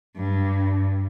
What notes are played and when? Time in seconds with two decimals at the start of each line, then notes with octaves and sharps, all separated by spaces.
0.16 G2